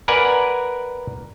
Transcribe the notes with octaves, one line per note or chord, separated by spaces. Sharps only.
A#4 B4 D5 F#5 G#5